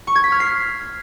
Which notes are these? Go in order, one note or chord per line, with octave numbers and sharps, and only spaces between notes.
C#6
G#6
B6
F6
C7